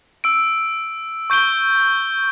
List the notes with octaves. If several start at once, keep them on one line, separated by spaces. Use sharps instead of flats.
E6 D7
C#6 G6 D7 G7